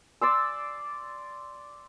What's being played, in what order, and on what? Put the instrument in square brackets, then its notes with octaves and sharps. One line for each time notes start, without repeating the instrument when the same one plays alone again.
[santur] D5 C6 E6